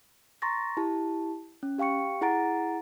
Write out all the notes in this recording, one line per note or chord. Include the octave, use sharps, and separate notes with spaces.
A#5 C6 C#6 A6 A#6
E4 G4 A5
C#4
G4 F5 G5 C#6 C#7
E4 G#4 F#5 A#5 A6 D7